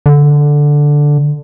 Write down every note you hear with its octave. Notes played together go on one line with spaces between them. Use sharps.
D3